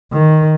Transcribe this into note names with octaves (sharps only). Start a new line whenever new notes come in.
D#3